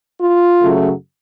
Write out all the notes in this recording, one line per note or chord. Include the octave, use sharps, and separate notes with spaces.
F4
F#2 C#3 F#3 A3